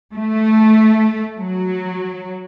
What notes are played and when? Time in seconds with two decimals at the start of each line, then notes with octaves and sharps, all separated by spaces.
0.16 A3
1.39 F#3